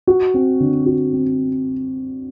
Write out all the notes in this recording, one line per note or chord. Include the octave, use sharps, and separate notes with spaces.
F#4
C4
D3
F#4
C4